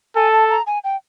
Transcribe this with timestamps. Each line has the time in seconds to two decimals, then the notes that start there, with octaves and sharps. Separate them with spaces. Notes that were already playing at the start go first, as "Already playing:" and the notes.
0.16 A4 G#5
0.32 A5
0.50 A#5
0.67 G#5
0.84 G5